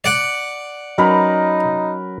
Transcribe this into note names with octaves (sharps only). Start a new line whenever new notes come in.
D5 F#5
F#3 C#4 D#4 A#4 B4 A#5 B5